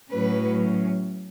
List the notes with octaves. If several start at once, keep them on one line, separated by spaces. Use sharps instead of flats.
A2 F#3 C#4 B4